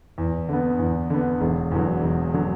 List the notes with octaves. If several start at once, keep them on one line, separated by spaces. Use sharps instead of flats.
E2
D3 B3
E2
D3 B3
E1
E2 D3 F#3
E1
D3 F#3